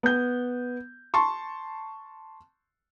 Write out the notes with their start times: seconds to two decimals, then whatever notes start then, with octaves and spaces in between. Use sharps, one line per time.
0.03 B3 G6
1.14 A5 C6 C#6